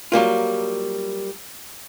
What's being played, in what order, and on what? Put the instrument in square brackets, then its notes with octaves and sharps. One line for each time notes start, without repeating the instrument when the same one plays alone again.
[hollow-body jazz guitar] F#3 G3 A#3 F4